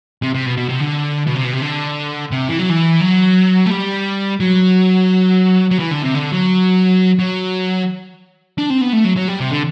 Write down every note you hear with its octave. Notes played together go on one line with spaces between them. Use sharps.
C3
C3
B2
B2
C3
D3
B2
C3
B2
C3
D3
C3
E3
F#3
E3
F#3
A3
G3
F#3
F#3
E3
D3
C3
D3
F#3
F#3
D4
C4
B3
A3
F#3
F#3
G3
C3
D3